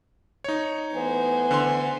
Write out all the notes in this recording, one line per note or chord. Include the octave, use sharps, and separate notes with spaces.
D#4 C#5
E3 A3 B3 C5 G#5
D3 C6